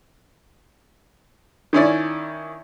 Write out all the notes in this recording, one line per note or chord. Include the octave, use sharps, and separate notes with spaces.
D#3 C#4 E4 D5